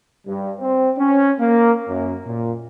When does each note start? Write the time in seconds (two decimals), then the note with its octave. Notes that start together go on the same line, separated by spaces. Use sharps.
0.26 G2
0.59 C4
0.97 C#4
1.39 A#3
1.88 F#2
2.26 A#2